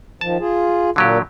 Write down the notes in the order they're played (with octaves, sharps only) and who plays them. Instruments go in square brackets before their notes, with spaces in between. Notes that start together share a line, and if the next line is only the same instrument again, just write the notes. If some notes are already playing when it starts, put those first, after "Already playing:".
[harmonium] D#3 F3 [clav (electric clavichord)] A5
[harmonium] F4 G#4
[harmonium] A#2 A#3 [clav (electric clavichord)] D3 F#3 G4